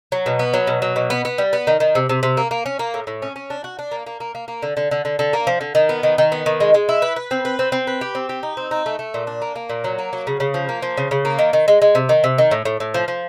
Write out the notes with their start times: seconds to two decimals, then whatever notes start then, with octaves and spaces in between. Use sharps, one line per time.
0.12 F#3
0.26 B2
0.39 B3
0.54 F#3
0.67 B2
0.82 F#3
0.96 B2
1.10 B3
1.25 B3
1.38 G3
1.53 B3
1.67 D#3
1.80 D#3
1.95 C3
2.09 C3
2.23 C3
2.37 A#3
2.51 A#3
2.66 C#4
2.79 A#3
2.94 A2
3.07 A2
3.22 C#4
3.36 C#4
3.50 D4
3.64 F#4
3.79 D4
3.92 A#3
4.07 A#3
4.20 A#3
4.35 A#3
4.48 A#3
4.62 D3
4.77 D3
4.91 D3
5.05 D3
5.19 D3
5.33 A#3
5.47 F3
5.61 D3
5.75 D#3
5.89 B3
6.03 D#3
6.18 D#3
6.32 B3
6.46 D#3
6.60 G#3
6.74 G#3
6.89 E4
7.02 B4
7.16 B4
7.31 C4
7.45 B4
7.59 C4
7.72 C4
7.87 B4
8.01 G4
8.15 C4
8.29 G4
8.43 D#4
8.57 C4
8.71 D#4
8.86 A3
8.99 A3
9.14 A#2
9.27 D4
9.42 A#3
9.56 A#3
9.70 A#2
9.84 F#3
9.99 A#3
10.13 F#3
10.27 C#3
10.40 C#3
10.54 F3
10.69 A#3
10.83 F3
10.97 C#3
11.11 C#3
11.25 A#3
11.39 D#3
11.53 D#3
11.68 G#3
11.82 G#3
11.95 C3
12.09 D#3
12.24 C3
12.38 D#3
12.51 A2
12.65 A2
12.80 A2
12.94 F3
13.08 F3